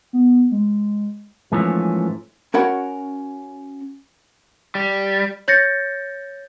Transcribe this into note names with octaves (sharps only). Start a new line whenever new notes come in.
B3
G#3
G#2 E3 F3 A3 A#3 C#4
C#4 F#4 A#4 C#5 F#5 B5
G3
C#5 G6 A6 A#6 C#7